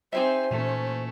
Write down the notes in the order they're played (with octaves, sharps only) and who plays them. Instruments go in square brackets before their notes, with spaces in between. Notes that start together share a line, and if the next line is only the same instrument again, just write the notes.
[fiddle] C4 G#5 [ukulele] D#4 G4 E5 [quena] C5
[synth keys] A#2 E3 A#3 [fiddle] A3 C#4